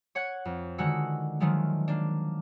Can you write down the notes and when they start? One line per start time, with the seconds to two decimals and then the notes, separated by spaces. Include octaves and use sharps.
0.15 C#5 F#5 F#6 G#6
0.45 F2
0.78 D3 D#3 G#3 F#4 F#5 E6
1.40 D#3 F3 F#3 G#3 A3
1.88 A#3 D4